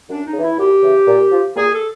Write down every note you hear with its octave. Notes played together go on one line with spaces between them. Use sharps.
F#2 D4
D#4
C#3
E3 E4
F#2 G4
C#3 E3
A#2
F3
A#2 G#4
A4